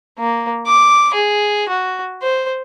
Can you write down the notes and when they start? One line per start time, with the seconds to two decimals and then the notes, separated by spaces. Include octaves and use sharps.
0.19 A#3
0.66 D6
1.14 G#4
1.69 F#4
2.22 C5